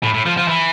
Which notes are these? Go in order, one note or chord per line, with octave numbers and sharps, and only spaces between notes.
A2
A2
F3
F3
E3